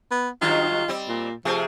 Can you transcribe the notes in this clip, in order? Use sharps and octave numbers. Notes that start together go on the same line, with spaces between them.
B3
G2 D#3 F#3 F4
G3 C4
A#2
C3 F3 A3 G#4